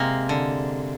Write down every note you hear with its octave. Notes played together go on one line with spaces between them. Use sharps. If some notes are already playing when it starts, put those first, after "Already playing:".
Already playing: C3 G#3 A#3
D3